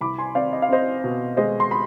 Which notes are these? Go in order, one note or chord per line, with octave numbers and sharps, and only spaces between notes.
C2 B5 D6
G#5 C6
C4 D5 F5
D#5
F5
C4 C5 D#5
B2
G#3 C5 D#5
C6
B5